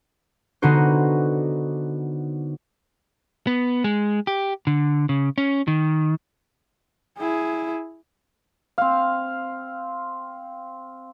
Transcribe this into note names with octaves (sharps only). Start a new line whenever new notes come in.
D3 B3 D#4 F#4 C5
B3
G#3
G4
D3
C#3
C#4
D#3
E4 G#4
C4 F5